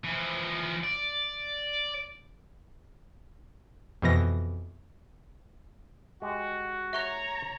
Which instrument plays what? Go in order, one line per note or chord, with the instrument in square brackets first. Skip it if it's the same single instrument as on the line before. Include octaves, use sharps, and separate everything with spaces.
[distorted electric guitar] E3 F3
D5
[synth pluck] F2 B2 E3 A#6
[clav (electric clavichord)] G#3 G4 [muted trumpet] F#4
[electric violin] C#5 A#5 [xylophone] E5 C#6 F#6